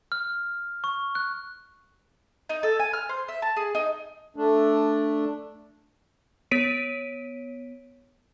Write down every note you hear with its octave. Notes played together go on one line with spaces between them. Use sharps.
F6
C#6
F#6
D#4
A4
G#5
F6
C5
E5
A5
G#4
D#4
A3 D4
B3 C#5 B6 D7 D#7